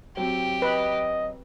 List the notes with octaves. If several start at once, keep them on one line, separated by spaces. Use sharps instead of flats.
F#3 C4 G4
B4 D#5